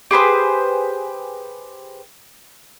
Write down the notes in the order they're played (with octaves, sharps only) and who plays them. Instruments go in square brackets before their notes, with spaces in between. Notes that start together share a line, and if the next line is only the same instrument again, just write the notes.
[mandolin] G4 G#4 B4 C5